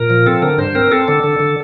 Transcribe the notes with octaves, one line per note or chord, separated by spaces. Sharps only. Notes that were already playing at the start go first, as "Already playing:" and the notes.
Already playing: A#2 A#4
F3
C4 A4
D3 A#4
G2 C5
C4 A#4
C4 A4
D3
D3
D3